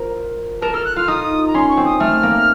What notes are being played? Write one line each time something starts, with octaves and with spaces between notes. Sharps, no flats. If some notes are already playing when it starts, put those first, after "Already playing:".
Already playing: F4 A#4 C5
A#4 A5
A4 F6
F#6
F4 F6
D#4 D#6
A#5
C#4 C6
C#6
C4
D#6
A3 F6
A#3